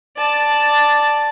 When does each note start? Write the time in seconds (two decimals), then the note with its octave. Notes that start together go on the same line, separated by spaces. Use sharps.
0.18 D5 A5